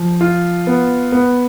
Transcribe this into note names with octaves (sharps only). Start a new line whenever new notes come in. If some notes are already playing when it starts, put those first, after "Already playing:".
Already playing: F3
F4
B3
B3